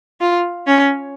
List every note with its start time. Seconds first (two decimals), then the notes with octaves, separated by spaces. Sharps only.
0.21 F4
0.68 C#4